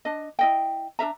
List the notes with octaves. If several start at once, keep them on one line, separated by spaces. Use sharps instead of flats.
D4 D#5
E4 D#5 G5
D4 A#4 E5 A#5